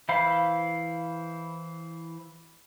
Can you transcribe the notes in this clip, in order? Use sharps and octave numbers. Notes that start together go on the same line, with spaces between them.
E3 E4 C5 F5 B5